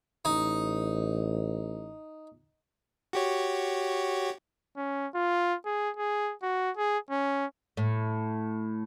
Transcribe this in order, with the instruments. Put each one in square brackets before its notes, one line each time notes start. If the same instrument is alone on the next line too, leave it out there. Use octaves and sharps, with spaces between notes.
[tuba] A1 [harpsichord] D#4
[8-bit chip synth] F#4 G4 C#5
[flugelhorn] C#4
F4
G#4
G#4
F#4
G#4
C#4
[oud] A2